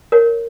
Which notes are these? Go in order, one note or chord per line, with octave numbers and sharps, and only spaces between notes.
A#4 C#5